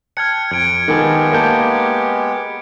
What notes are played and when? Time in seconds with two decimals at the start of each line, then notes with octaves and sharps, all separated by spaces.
0.17 G5 A5 F6 F#6 G#6 C#7
0.51 F2 G#6 D7
0.88 D#3 G#3 B3 G4 A4 A#4 G#5
1.32 A#3 A5 G6